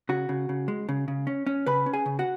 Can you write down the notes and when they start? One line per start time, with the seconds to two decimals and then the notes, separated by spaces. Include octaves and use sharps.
0.09 C#3 F#4
0.29 C#3
0.49 C#3
0.68 G#3
0.89 C#3
1.08 C#3
1.27 C#4
1.47 C#4
1.67 C#3 B4 B5
1.86 C#4
1.93 G#4 G#5
2.06 C#3
2.19 F#4 F#5